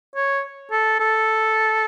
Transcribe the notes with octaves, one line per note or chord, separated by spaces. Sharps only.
C#5
A4
A4